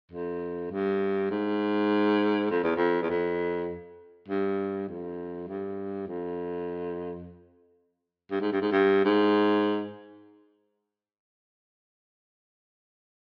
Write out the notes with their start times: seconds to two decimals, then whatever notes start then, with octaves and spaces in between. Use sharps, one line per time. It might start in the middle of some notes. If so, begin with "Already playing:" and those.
0.12 F2
0.71 G2
1.31 G#2
2.50 F2
2.63 E2
2.77 F2
3.03 E2
3.10 F2
4.28 G2
4.88 F2
5.47 G2
6.07 F2
8.31 G2
8.41 G#2
8.52 G2
8.62 G#2
8.72 G2
9.05 G#2